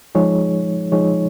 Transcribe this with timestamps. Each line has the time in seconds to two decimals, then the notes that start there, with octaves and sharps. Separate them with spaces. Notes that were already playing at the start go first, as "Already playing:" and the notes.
0.15 F3 G#3 D#4 G#4 C#5
0.92 F3 G#3 D#4 G#4 C#5